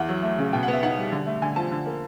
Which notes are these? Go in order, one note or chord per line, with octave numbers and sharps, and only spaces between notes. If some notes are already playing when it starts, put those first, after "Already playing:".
Already playing: E2 F#5
F#3
A3
C#3
B2 G5
F#5
B3 E5
D#4 F#5
G3
D3
A3
D3 G#5
F3 A5
D3
A#3